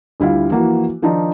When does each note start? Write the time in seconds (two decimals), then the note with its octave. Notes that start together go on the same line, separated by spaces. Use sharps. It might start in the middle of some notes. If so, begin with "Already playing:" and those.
0.20 D2 G3 E4 F4 F5
0.50 E3 F3 A#3 F#4
1.02 D#3 F3 D4 D#4 F4